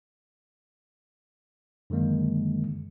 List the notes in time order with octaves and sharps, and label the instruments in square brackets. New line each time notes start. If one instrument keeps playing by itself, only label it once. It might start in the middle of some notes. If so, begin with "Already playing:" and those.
[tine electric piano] F#2 D3 D#3 G#3 A#3